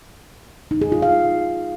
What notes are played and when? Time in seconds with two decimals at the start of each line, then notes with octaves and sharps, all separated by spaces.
0.71 D#4
0.81 G#4
0.92 F4
1.02 F5